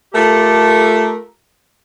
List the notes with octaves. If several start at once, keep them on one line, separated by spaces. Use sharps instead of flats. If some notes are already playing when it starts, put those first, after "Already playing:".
A3 F4 G4 A4 A#4